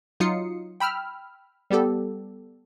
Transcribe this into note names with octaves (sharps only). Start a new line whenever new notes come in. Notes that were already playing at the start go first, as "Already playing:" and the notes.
F#3 D#4 F4 D#6 C7 C#7
G5 B5 E6 F6
G3 B3 G4 A4